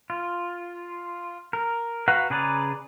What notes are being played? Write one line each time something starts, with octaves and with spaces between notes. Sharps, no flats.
F4
A#4
F#4 B4 F5 F#5 A#5
C#3 G#4 B4 D5 A#5